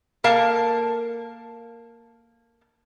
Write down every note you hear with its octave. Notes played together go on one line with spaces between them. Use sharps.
A#3 A4 A#4 F5 A5